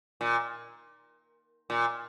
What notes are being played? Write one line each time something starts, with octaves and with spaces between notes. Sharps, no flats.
A#2
A#2